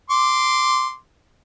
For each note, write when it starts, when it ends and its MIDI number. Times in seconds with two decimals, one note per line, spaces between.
0.10 0.95 84
0.10 0.95 86